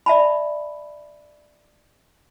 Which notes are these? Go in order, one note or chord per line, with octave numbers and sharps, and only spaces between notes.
D5 E5 A5 B5